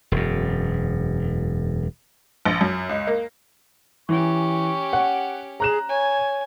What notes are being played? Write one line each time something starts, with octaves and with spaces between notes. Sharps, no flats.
E1 F#2
A#1
F#2
C#2
A#3
E3 C#4 G4 C#6
F#5
G#4 A#5 F#6 E7
C#5 G#5